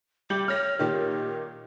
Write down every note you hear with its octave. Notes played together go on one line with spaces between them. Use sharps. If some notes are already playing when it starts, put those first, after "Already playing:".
G3 D6 G6 F#7
C#5 F6 A#6
A#2 D#3 G4